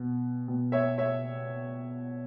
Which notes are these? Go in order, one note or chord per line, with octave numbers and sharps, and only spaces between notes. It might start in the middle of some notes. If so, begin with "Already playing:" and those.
Already playing: B2
B2
C#5 E5
C#5 E5